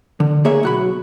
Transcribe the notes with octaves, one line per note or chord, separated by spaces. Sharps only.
D3
A#3 G#4 C#5 E5
B1 F#4 B5